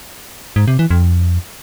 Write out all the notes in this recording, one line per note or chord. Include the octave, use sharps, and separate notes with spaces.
G#2
C3
E3
F2